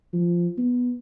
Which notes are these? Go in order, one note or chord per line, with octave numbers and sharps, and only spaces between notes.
F3
B3